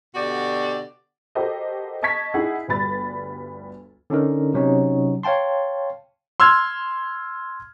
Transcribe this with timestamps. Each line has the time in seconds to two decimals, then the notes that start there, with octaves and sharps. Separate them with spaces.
0.15 B2 D3 F#4 G4 D5
1.35 F#4 G4 A4 A#4 C5 D#5
2.02 D#5 A5 C#6 G#6 B6
2.34 D#4 E4 G#4 F#5
2.68 G1 D2 G3 B4 B5 A6
4.10 D3 C#4 D#4 A#4
4.54 C3 F#3 C#4 D#4
5.23 C#5 F5 G5 A5 C6
6.40 C6 E6 F6 G#6